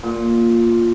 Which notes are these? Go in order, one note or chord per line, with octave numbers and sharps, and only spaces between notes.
A#2